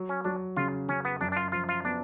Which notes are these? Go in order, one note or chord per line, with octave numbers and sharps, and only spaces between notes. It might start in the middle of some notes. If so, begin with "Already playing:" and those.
Already playing: F#3
C#4
F#3 D4
C#3 F4
C#3 C#4
B3
F#2 D4
D4
F4
F3 F4
F4
B3 D4